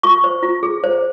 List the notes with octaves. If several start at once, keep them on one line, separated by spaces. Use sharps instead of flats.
F4 C#6
C5
F4
G#4
C5